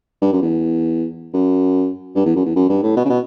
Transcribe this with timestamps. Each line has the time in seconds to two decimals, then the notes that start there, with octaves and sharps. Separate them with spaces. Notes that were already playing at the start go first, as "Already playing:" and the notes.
0.22 G2
0.32 F#2
0.42 E2
1.34 F#2
2.15 G2
2.25 E2
2.35 F#2
2.45 E2
2.56 F#2
2.69 G2
2.83 A2
2.97 B2
3.05 C#3
3.10 B2